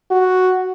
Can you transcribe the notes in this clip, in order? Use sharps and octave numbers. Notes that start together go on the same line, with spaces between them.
F#4